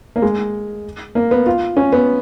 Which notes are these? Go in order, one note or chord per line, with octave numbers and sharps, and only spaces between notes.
A#3
G#3
A#3
B3
F4
C#4
B3